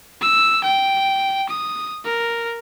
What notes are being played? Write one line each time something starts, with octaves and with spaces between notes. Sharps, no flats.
E6
G5
D#6
A#4